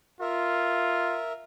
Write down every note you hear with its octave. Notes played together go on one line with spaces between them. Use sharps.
F4 A#4 E5